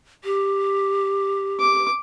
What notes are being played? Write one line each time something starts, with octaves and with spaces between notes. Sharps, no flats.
G4
D6